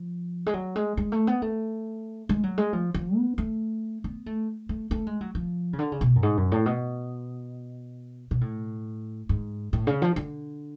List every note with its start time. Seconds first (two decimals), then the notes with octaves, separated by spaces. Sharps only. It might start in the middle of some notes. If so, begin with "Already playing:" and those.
Already playing: F3
0.46 G#3
0.54 F#3
0.76 G#3
0.97 G#3
1.12 A3
1.27 B3
1.42 A3
2.29 G#3
2.43 F#3
2.58 G#3
2.73 F3
2.94 F3
3.17 B3
3.38 A3
4.04 B3
4.26 A3
4.69 A3
4.91 A3
5.07 G#3
5.21 F#3
5.35 F3
5.73 C#3
5.79 D3
5.92 C#3
6.01 B2
6.16 F#2
6.23 G#2
6.37 F#2
6.52 A2
6.66 B2
8.31 B2
8.41 A2
9.29 G#2
9.73 A2
9.87 C#3
10.02 F3
10.16 D3